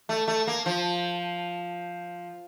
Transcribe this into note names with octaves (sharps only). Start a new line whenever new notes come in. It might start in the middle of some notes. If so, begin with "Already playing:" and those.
A3
A3
A#3
F3